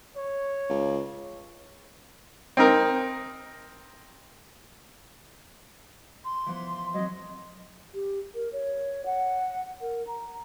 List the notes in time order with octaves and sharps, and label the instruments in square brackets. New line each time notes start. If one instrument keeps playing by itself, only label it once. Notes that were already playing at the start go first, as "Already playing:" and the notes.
[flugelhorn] C#5
[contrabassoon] C#2
[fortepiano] C4 D#4 A#4
[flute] C6
[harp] E3 F3 B3
[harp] F#3 C4 [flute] D#5
[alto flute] G4
A#4
C#5
F#5
A#4
A#5